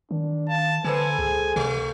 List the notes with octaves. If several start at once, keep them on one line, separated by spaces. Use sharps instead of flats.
D#3 D4
F5 A5
D3 A#3 A4 B4 C5 G#5
C#2 G#4
C3 A3